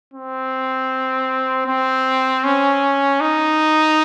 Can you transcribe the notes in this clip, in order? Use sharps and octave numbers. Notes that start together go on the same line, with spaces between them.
C4
C4
C#4
D#4